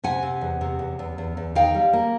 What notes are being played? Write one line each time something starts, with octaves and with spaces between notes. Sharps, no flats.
C3 F#5 G#5
C3
E2
C3
E2
E2
E2
E2
D#3 F5 G5
G3
A#3